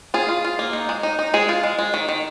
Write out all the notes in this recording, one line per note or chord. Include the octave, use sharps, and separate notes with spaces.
F4 G#4
F4
F4
A#3
D#4
G#3
D#4
D#4
G#3 G#4
F4
G#3
G#3
D#3
D#3